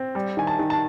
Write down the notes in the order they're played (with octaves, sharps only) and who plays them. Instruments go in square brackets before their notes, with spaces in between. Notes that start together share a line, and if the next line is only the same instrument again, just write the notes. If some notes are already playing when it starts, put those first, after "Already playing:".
Already playing: [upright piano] C4
G3
D#3 G#5
A5
D#3
A5